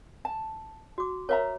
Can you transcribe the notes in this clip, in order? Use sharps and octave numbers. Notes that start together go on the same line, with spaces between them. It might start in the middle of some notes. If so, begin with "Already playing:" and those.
A5
F#4 D6
A#4 C#5 E5 A#5